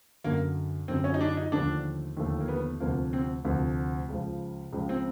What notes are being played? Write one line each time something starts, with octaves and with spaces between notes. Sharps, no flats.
F#2 D3 F#3 A#3
F#2 D3 F#3 C4
C#4
D#4
D4
D#4
D#2 D3 F3 A3 D4
D#2 D3 F3 A3
A#3
B3
D2 C3 F3 A#3
C4
D2 C3 F3
C#2 C#3 F3
C#2 C#3 F3
C4